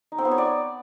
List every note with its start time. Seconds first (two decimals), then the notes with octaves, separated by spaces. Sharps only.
0.12 D#4
0.18 C4
0.25 B3
0.31 C#5
0.38 D5